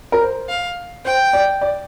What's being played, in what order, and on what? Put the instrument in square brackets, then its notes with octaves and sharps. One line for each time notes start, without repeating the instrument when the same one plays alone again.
[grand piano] A#4
C5
[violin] F5
[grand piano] C5 [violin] G5
[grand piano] D5
D5